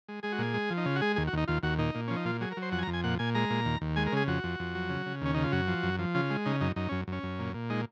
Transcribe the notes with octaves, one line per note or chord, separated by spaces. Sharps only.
G#3
G#3 G#4
F#4
A#2 G#4
G#3
F3
D#4
C#3 F4
F#4
G#3 G#4
D#2 G#4
F#4
D#2 D#4
D#2 F4
D#2 F#4
A#2 D#4
A#2
F3 C#4
D#4
A#2 F4
F#3 G#4
A#4
F#3
C5
F2 F#5
G#5
A#5
F2
G#5
A#2 F#5
A#2 G#5
G#3 A#5
A#2
D#2
D#2
G#3 G#5
A#4
C#3 G#4
F2 F#4
F2
F2
F#3
C#3
C#3
D#2 C#4
C#3 D#4
F4
F#2 F#4
F3
F#2
F3
C#3 F4
G#3
C#3 D#4
F#2 D#4
F#2 D#4
F#2 C#4
F#2 C#4
F#2
A#2
A#2
G#3 D#4